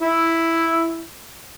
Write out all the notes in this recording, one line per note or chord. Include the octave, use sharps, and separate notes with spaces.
E4